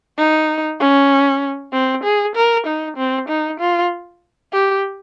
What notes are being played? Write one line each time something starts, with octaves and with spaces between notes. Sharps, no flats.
D#4
C#4
C4
G#4
A#4
D#4
C4
D#4
F4
G4